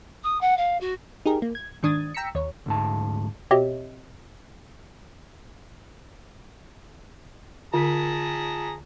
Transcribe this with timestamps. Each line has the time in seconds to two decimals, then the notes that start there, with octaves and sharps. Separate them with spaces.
0.23 D#6
0.41 F#5
0.57 F5
0.81 F#4
1.26 D#4 G4 G#4 A#4
1.42 A#3
1.55 G#6
1.83 G#2 D#3 D4 D#6 G#6 A6
2.14 G5 A#5 E6 B6 C#7
2.35 D#2 C#5
2.66 D2 G#2 A5
3.51 B2 C4 G4 C#5 D#5 E5
7.74 D3 F4 G#4 A5 A#5 B6